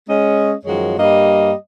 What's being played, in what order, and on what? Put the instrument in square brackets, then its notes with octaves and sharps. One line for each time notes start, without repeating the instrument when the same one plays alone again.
[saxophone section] G#3 C#4 D#5
F#2 D#3 F3 G#3 F#4 C#5
G2 G3 A#3 D#5